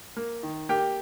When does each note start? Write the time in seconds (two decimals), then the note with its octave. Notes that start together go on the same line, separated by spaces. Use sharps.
0.17 A#3
0.43 D#3
0.69 A#3 G4 G5